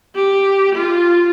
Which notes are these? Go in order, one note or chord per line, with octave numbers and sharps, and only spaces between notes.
G4
F4